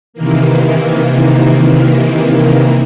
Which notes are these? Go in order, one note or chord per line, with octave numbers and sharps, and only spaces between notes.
C3 D#3 E3 A#3